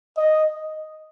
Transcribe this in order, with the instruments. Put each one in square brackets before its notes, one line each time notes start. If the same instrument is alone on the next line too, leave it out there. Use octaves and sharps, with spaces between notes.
[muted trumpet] D#5